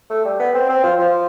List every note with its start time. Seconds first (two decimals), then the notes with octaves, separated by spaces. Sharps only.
0.10 A3
0.25 G3
0.40 B3
0.54 C4
0.69 C4
0.83 F3
0.99 F3